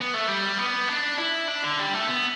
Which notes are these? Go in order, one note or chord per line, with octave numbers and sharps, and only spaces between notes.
B3
A3
G3
B3
D4
E4
D4
D3
G3
A3
B3